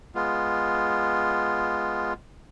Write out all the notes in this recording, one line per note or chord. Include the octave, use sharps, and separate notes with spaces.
G#3 B3 F4